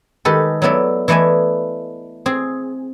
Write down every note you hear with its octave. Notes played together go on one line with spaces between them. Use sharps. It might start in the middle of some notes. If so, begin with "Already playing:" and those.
D#3 G#3 G4 A4 B4
F#3 A3 B3 E4 D5
E3 A3 E4 D5 D#5 G#5
C4 G#4